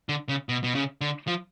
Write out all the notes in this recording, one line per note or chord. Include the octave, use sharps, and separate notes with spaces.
D3
C#3
B2
B2
C#3
D3
F3